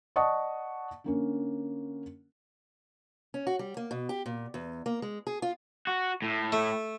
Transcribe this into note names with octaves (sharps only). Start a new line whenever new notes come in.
D5 D#5 F#5 A5 C#6 D#6
D3 A#3 C#4
C#4
F#4
G3
A#3
B2
G4
A#2
E2
A#3
G#3
G#4
F4
F#4
A2
A3